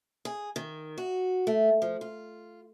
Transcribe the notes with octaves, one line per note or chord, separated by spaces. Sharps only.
G#4
D#3
F#4
A3
F3
F4